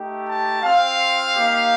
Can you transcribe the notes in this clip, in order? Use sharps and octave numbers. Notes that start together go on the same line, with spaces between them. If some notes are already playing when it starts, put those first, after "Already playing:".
Already playing: A3 D#4 G4
A5
C4 F4 F5
A#3 D#4 G4